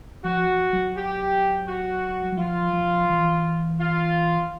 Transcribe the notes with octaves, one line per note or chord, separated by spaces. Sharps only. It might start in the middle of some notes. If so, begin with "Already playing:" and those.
F3 F#4
F#3
G4
F#4
F#3
F3 F4
F3
E3
F4